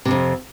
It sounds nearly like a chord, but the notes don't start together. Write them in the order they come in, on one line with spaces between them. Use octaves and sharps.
C3 A2 F2